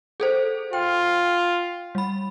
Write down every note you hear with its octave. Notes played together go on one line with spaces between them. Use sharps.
G#4 A4 C5
F4 G5
G3 B5